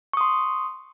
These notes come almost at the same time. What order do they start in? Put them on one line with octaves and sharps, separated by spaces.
C#6 D#6 C6